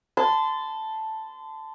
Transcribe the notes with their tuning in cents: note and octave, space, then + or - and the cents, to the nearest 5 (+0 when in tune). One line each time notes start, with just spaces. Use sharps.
A5 +0 C6 -30